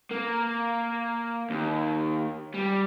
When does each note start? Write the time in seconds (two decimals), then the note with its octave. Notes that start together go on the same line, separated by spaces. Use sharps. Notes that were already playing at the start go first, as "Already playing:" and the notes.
0.11 A#3
1.50 D#2
2.54 G3